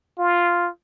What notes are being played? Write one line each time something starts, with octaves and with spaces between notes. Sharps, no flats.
F4